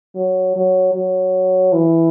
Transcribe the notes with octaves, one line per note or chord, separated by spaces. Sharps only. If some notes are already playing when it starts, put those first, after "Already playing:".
F#3
F#3
F#3
E3